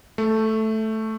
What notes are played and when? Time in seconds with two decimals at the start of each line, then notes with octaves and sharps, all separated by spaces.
0.18 A3